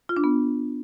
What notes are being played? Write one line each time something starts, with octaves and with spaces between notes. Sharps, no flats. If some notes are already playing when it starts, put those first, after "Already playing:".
F4
D4
B3